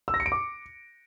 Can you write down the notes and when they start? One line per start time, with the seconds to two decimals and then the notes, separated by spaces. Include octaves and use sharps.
0.08 E6
0.14 A#6
0.20 C#7
0.26 D7
0.32 D6